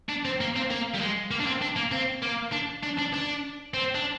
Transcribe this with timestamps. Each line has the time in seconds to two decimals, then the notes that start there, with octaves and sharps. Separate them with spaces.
0.09 D4
0.25 C4
0.41 A#3
0.56 C4
0.70 A#3
0.94 G3
1.01 G#3
1.31 A#3
1.40 D4
1.47 C4
1.62 D4
1.76 A#3
1.92 C4
2.22 A#3
2.52 D4
2.83 D4
2.98 D4
3.13 D4
3.74 C4
3.95 D4